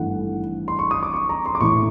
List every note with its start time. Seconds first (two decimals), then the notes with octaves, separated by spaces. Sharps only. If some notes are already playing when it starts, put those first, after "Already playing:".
Already playing: G#1 G2 E3 A3 F#5
0.68 C6
0.79 C#6
0.91 D#6
1.03 D6
1.14 C#6
1.29 A#5
1.46 C6
1.55 D6
1.60 A1 A2 E3 C#6